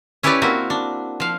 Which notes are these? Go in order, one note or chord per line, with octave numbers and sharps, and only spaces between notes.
C#4 E4 G4 B4 C#5 D5
A#3 C4 E4 F#4
D4
F3 F5